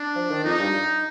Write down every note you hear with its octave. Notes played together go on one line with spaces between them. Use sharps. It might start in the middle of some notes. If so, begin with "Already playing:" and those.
Already playing: D4
F3
D#3
F2 D#4
G2